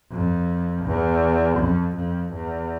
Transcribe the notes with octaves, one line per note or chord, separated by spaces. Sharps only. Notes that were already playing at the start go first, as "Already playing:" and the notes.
F2
E2
F2
F2
E2